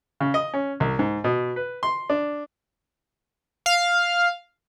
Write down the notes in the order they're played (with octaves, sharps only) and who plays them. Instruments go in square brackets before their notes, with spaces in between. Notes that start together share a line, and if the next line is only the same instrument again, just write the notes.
[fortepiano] C#3
D#5
C#4
C2
G#2
B2
B4
C6
D4
[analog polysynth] F5